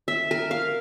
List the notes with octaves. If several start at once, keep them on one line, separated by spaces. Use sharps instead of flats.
E5
A#4
F5